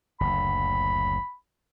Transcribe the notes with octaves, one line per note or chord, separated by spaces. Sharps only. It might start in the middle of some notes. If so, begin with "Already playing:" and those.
F#1 D2 B5